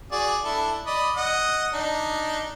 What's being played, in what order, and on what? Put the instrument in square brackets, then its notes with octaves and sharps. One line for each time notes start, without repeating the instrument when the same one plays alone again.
[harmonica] F#4 G#4 D5
D4 E4 A4
D5 D#5 B5
D#5 F#5
D4 D#4